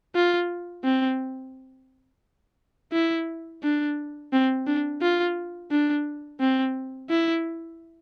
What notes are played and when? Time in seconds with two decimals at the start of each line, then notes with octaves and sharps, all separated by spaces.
0.15 F4
0.84 C4
2.92 E4
3.63 D4
4.33 C4
4.67 D4
5.02 F4
5.71 D4
6.40 C4
7.10 E4